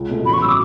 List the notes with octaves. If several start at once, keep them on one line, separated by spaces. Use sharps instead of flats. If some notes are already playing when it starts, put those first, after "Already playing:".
Already playing: C#2
B2 A3
A1 B5
C#6
F#3 E6
D6